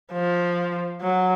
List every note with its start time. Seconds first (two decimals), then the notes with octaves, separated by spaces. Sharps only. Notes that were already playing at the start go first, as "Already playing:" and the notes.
0.12 F3
1.01 F#3